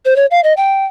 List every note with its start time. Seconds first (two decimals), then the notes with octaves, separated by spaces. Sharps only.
0.05 C5
0.16 C#5
0.31 F5
0.44 D#5
0.57 G5